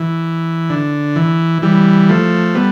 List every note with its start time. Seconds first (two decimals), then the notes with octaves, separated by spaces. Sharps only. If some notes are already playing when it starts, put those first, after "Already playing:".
Already playing: E3
0.70 D3
1.16 E3
1.62 E3 G3
2.09 F3 A3
2.55 G3 B3